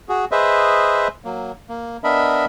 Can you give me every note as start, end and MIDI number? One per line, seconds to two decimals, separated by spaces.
0.09 0.25 66
0.09 0.25 68
0.32 1.08 68
0.32 1.08 71
0.32 1.08 72
0.32 1.08 75
0.32 1.08 76
1.25 1.52 54
1.25 1.52 58
1.69 1.97 58
2.04 2.45 59
2.04 2.45 62
2.04 2.45 70
2.04 2.45 75
2.04 2.45 76
2.04 2.45 83